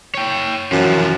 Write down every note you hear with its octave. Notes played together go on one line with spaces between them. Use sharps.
C#5 G5
F#2 E3 F3